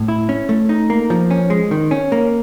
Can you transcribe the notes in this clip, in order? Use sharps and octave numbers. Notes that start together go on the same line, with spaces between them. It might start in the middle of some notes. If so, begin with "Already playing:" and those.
Already playing: A2
E4
C#4
A3
D#4
A#3
F3
C#4
G#3
D#3
C#4
A#3